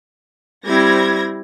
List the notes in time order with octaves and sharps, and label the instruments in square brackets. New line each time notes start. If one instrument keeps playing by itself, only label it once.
[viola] G3 E4 [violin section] C4 G#6 A#6